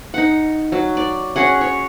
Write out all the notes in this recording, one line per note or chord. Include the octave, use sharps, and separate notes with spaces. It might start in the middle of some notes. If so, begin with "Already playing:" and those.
D#4 F#5
F#3
D5
C#4 F#4 G#4 F#5
C#5